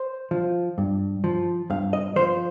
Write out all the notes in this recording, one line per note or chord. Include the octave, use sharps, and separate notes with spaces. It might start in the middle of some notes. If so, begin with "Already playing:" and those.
Already playing: C5
F3
G2
F3
G2 F5
D#5
F3 C5